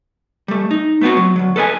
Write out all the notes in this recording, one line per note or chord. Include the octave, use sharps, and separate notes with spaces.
G3 A3
D#4
A3 B3 C4 F#4
F#3
D2 F#3
A4 B4 D#5 G#5